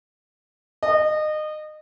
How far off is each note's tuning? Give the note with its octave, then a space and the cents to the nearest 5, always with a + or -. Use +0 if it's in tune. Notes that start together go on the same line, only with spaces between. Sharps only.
D#5 -25